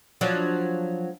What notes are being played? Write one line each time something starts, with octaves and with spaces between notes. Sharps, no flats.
F3 F#3 D4